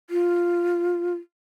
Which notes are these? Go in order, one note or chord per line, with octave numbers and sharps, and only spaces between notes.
F4